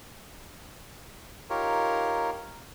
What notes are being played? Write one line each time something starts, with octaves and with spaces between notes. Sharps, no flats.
D#4 F4 G4 A#4 C#5